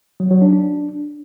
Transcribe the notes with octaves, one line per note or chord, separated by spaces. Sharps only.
F#3
F#3
D4
D4